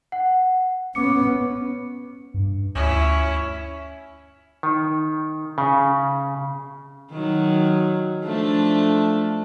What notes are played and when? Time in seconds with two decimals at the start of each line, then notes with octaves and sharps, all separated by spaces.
0.12 F#5
0.95 B3 C#4 D6 C#7
2.34 G2
2.75 D2 C#4 E4
4.63 D#3
5.58 C#3
7.12 D#3 F#3
8.24 F3 A3 D4